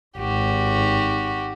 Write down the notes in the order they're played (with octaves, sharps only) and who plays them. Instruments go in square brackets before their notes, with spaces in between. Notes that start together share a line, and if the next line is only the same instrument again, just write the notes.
[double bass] G#1 [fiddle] F#4 G4